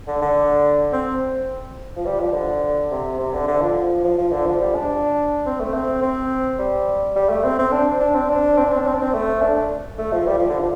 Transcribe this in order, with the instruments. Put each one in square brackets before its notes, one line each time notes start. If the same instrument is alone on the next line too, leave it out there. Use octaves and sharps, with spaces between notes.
[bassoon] D3
D3
C4
F3
G3
F3
D3
C3
C3
D3
D3
F3
F3
F3
D3
F3
G3
D4
C4
A3
C4
C4
G3
G3
A3
C4
C4
D4
D4
C4
D4
C4
D4
C4
D4
C4
D4
C4
A3
D4
A3
F3
G3
F3
D3
F3